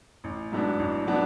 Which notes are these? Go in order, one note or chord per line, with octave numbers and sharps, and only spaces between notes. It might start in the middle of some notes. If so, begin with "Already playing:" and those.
A1
G#2 F#3 B3 D4
A1
F#3 B3 D4